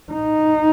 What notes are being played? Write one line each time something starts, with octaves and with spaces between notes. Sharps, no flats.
D#4